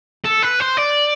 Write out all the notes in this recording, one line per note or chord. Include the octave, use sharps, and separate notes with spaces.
A4
B4
C5
D5